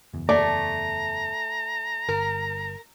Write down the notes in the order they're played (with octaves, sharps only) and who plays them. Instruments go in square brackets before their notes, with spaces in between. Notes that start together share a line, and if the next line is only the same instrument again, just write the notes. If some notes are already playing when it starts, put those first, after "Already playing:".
[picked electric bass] F#1 E2
[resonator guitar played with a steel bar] A3 [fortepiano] D5 [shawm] A#5
[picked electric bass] G1 [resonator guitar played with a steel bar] A#4